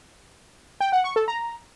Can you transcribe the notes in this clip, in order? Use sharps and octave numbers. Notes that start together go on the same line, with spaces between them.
G5
F#5
C#6
A4
A#5